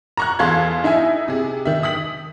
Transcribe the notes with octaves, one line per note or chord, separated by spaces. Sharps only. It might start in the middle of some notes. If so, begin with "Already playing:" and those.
A#5 C#6 F#6
E2 A4 F5 C6 G#6
D#4 E4 E5 G#5
C3 G#4
D#3 E5
D#6 B6 F#7